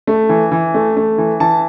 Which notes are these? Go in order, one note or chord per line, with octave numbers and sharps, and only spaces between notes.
A3
E3
E3
A3
A3
E3
E3 A5